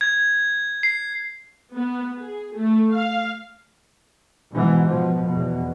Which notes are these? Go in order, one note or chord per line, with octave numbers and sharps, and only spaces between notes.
G#6
C7
B3
G#4
A3
F5
G#2 B2 E3
B2 F3
E2 B2